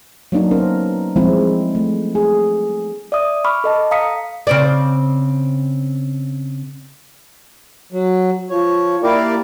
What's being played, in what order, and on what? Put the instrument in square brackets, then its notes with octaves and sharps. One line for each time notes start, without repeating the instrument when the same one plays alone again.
[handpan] F#3 A#3 D4 D#4
B3 C#4 A#4 C5
F3 G3 G#3 C4 E4
A3
G#4
[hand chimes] D5 E5 D#6
B5 C#6 D6 F6
A4 D#5 A5
F5 A#5 D#6 B6 C#7
[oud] C#3 C4 D5
[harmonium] F#3
F3 C#5
A#3 E4 G4 A#4 D5